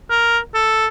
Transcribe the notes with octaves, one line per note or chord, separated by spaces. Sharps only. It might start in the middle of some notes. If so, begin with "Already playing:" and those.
A#4
A4